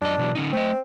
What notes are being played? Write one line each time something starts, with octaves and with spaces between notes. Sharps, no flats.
F#2 D4 D#5
B2 E3 F#3
D3 C#4 D#4
A3 C4 D#5